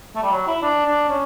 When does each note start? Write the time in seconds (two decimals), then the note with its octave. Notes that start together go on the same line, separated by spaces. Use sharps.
0.15 A3
0.22 G3
0.31 F#3
0.47 E4
0.62 D4
0.85 D4
1.09 C#4